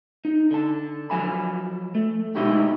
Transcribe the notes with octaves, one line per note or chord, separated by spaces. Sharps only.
D#4
D3 A5
F3 F#3 G#5 B5
A3
B2 G#3 D#4 E4 F#4 G4